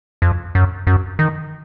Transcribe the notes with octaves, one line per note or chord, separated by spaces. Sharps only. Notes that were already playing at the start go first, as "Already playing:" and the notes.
F2
F#2
F#2
D#3